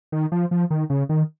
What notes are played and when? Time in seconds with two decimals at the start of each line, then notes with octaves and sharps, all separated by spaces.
0.12 D#3
0.32 F3
0.51 F3
0.70 D#3
0.90 C#3
1.09 D#3